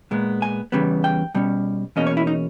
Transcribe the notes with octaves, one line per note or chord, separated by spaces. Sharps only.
A#2 G#3 B3
G#5
E2 C#3 G3 B3
G5
B2 G3 C#4
E2 B2 A#3 C#4 D#5
C#5
E4
D#4